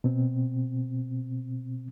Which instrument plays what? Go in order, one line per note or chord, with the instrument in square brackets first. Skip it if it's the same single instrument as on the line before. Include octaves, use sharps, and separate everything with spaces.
[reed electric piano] B2 C4